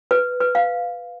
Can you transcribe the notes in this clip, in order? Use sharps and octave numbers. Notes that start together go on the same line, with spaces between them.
B4
B4
F5